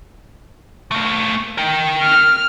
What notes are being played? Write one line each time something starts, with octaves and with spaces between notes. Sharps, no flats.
A3 A#3
A#4 G5
F6